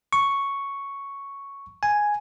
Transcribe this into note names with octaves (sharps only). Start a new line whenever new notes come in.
C#6
G#5